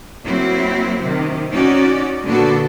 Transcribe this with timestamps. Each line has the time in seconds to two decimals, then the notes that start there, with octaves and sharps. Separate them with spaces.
0.24 F#3 A#3 C4 E4 F#4
1.03 C3 D#3
1.51 C#4 D#4 F#4 D5
2.25 A#2 D3 B3 D4 F#4 A4